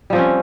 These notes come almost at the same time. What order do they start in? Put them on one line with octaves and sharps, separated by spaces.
G3 F3 C4 C#4